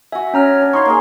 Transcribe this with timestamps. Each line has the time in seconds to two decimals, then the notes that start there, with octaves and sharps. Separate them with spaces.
0.12 F#4 E5 G#5
0.34 C#4 C#5 A#5 F6
0.62 D4
0.73 D#4 F5 C6 C#6
0.85 A#3 G#4